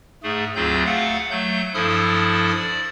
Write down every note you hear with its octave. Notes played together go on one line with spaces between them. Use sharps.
G#2 A3 G#4
D2 F#3 C4 F4 G#4 G6
A3 F5 F#5
F#3 A3 G6
G2 F3 E4 A4 D#6 F6
D5